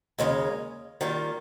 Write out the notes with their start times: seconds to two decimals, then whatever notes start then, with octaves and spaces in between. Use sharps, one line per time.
0.19 D#2 C#3 G#3 C#4
1.01 D#3 G3 A#3 F4